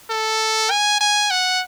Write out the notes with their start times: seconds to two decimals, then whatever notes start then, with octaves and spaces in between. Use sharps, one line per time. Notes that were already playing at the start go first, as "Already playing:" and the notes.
0.10 A4
0.71 G#5
1.01 G#5
1.30 F#5